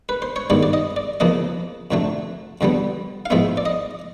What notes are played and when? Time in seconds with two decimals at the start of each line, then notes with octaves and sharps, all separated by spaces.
0.09 B4
0.22 C5
0.36 C#5
0.50 G2 D#3 G#3 B3 D5
0.63 D5
0.73 D#5
0.96 D5
1.20 E2 C#3 F3 A#3 D#5
1.91 F2 D3 F#3 A3
2.61 F2 D3 G3 B3
3.26 F5
3.30 A2 F3 G#3 B3 E5
3.57 D5
3.66 D#5